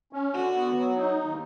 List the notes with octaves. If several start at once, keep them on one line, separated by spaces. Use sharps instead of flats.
C#4
D3 F#4
B3
F#3
D#4
D#2